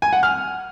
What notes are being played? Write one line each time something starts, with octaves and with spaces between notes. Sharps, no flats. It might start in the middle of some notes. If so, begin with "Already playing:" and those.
G#5
F#5
F6